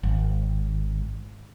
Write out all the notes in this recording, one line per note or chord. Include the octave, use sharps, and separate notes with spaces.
G#1